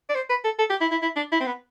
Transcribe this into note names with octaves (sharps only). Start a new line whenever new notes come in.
D5
C5
B4
A4
A4
G4
E4
E4
E4
D4
E4
C4
B3